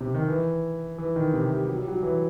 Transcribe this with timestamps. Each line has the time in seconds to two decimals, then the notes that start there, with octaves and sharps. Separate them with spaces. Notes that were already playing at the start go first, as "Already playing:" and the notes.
0.01 C3
0.14 D#3
0.28 E3
0.98 E3
1.16 D#3
1.34 C3
1.50 G3
1.68 F#3
1.79 G3
1.88 F#3
2.03 E3